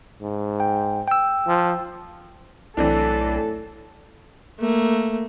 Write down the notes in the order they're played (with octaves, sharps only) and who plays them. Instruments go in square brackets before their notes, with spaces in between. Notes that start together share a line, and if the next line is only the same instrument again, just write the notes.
[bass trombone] G#2
[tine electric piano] G5
G5 E6
[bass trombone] F3
[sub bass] B1 [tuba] A2 [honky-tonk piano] E3 C4 D4 [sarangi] A4
[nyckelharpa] A3 A#3